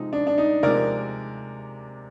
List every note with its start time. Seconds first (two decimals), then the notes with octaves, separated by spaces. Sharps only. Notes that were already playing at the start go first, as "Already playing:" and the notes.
Already playing: C3 F3 G#3 D#4
0.13 D4
0.27 D4
0.38 D#4
0.63 C3 F3 G#3 A#4 D5